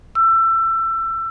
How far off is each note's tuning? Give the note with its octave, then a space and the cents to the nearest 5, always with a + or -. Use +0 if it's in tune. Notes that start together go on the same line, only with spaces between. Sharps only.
E6 +25